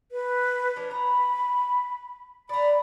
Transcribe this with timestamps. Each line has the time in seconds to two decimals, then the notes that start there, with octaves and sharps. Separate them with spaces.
0.12 B4
0.76 F3 C#4 D4
0.91 A#5 B5
2.49 D5 A#5 B5